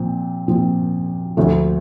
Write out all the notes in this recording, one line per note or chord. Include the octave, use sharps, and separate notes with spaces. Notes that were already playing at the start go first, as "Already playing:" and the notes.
Already playing: A#2 F3 C4
A#2 F3 C4
D2 D3 F3 A3